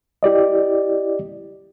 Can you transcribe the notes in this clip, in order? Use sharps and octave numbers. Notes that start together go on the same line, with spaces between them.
E4 G4 D5 D#5